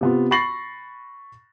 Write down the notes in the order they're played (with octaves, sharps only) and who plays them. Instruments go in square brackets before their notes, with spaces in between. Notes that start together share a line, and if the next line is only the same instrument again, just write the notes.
[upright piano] C3 B3 F4
B5 C#6 A6 A#6 C7 F#7